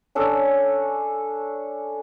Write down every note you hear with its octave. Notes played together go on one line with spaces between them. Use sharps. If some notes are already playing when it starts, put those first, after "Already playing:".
C#4 D4 A4